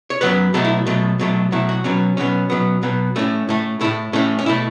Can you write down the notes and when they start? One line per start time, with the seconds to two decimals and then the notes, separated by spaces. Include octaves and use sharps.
0.10 C#5
0.21 F#2 F#3 B3 B4
0.54 B2 F#3 A3 A4
0.64 E4
0.86 B2 F#3 A3
1.19 B2 F#3 A3
1.52 B2 F#3 A3 E4
1.69 F#4
1.84 B2 F#3 B3 C#4
2.17 B2 F#3 B3 C#4
2.50 B2 F#3 B3
2.83 B2 F#3 B3
3.16 A2 A3 C#4
3.49 A2 A3
3.81 A2 A3 E4
4.13 A2 A3 C#4
4.39 C#4
4.46 B2 A3 E4